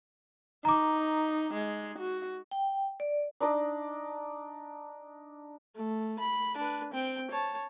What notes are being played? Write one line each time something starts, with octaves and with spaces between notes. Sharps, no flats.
D#4 A#5 D6
G#3
F#4
G5
D5
D4 D#4 D5 D#5
A3
B5
D4 B4
C4 G5
C#5 A5